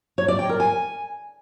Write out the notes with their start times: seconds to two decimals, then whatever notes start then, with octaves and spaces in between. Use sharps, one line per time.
0.18 C#5
0.28 D5
0.39 G5
0.49 A#4
0.60 G#5